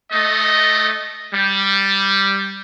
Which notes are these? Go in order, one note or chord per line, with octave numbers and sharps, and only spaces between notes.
A3 D#5
G3